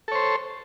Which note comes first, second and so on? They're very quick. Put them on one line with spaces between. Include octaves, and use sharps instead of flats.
A4 C#5 C5